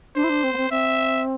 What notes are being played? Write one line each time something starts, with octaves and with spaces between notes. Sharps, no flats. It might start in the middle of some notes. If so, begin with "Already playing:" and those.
D4 C5
E4
D4
C4
B3
C4
C4 E5